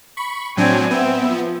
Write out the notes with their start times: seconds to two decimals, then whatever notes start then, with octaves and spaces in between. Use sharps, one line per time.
0.17 B5 C#6
0.57 A2 F#3 C4 D4 G#5
0.91 B3 C4 E5
1.28 F3